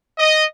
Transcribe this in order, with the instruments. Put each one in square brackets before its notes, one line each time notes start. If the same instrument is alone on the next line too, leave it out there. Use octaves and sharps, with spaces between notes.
[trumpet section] D#5